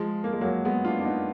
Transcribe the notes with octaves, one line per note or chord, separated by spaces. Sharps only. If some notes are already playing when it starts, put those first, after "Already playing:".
Already playing: F3 G#3
A#3
G#3
F#3 A#3
G#3 B3
D4 F4
D4
B3 D#4